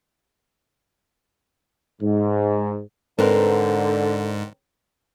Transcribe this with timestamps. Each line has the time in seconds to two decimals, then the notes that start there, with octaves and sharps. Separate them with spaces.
2.02 G#2
3.19 G#2 D3 C4 A#4 B4